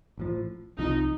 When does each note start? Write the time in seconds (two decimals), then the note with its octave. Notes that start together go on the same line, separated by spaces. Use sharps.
0.18 A1 A2 F3
0.79 C2 C3 F3 D#4